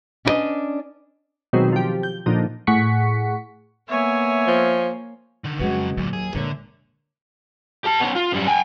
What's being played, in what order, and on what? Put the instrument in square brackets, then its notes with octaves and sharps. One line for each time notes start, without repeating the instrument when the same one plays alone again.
[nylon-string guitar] C#4 D4 E4 B4 D5 D#5
[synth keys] B2 D#3 F#3 G#3 C4
F3 G4
G6
A#2 D3 F3 D#4
[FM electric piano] A2 G#4 F#5 C#6 B6 C#7
[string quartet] A#3 [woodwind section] B3 E5 [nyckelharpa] C#5 G#5
[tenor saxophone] F3
[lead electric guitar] D3 D#3
[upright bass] F2 C#4 [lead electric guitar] C#3 F#3 [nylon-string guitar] G#3 F#4 B4
[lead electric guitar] D2 A#2 [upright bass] F#3
[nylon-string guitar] D#2 [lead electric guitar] G#4
[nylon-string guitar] A#2 C#5 E5 [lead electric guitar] D3 [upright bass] G#3
[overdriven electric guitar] G4 A5
B3 C#4
F4
F#2 G3
G5 G#5